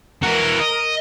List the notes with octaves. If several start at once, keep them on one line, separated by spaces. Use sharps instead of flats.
E3 F#4 A#4
D#5